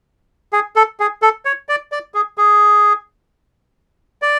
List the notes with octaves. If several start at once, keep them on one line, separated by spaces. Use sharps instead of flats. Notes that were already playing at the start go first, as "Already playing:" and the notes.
G#4
A4
G#4
A4
C#5
D5
D5
G#4
G#4
D5